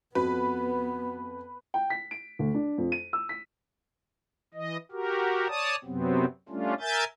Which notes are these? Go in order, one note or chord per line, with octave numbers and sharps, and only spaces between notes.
F2 B3 F#4 B4
G5
B6
D7
D2
D4
F2
D#7
E6
B6
E3 D#5
F#4 G4 A#4
C#5 D5 A5 D#6
F#2 C3 F#3 B3 C4
G3 A3 C#4 D4 F4
A#4 E5 G#5 G6 A6